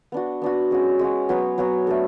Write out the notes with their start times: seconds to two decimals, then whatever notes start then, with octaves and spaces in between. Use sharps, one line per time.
0.12 B3 D4 F#4
0.42 B3 D4 F#4
0.71 G#3 C#4 F#4
0.99 G#3 C#4 F#4
1.29 F#3 B3 F#4 C#5
1.58 F#3 B3 F#4 C#5
1.87 A3 D4 A4